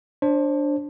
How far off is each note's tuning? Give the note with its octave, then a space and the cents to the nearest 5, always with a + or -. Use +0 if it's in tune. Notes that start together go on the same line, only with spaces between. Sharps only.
D4 +0 C5 +30